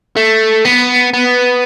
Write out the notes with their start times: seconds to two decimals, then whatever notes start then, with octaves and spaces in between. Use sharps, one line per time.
0.17 A3
0.65 B3
1.13 B3